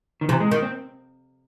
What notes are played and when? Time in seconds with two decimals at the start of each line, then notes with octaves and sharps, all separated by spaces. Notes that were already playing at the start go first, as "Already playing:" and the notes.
0.21 D#3
0.29 C3 E3
0.40 G#3
0.51 D#3
0.62 C4